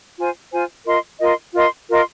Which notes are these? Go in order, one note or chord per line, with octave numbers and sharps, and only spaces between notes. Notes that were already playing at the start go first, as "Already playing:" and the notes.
F4 C5 G#5
F4 C5 G#5
F4 A#4 D#5 C6
F4 A#4 D#5 C6
F4 A#4 D#5 C6
F4 A#4 D#5 C6